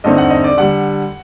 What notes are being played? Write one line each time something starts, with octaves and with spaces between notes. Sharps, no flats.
G2 D3 A3 C4 D#4 D#5
F#5
D#5
D5
D3 G3 F#5